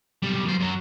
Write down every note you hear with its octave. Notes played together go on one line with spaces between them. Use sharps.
B1 G3
F#2 C5
F#2 F#3